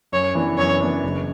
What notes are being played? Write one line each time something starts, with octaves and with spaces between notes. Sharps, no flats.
F#2 C#5
E3 B3 D4
F#2 C#5
E3 B3 D4
F#1